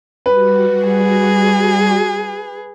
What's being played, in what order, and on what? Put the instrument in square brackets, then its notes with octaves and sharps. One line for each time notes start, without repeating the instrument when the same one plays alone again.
[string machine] G3 F#4 [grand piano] B4
[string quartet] G#4